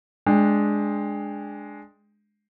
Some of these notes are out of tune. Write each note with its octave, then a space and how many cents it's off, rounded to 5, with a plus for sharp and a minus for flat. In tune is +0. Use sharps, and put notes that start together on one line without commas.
G#3 +5 D4 +0 G5 +25